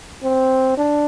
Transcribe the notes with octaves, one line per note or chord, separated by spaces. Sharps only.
C4
D4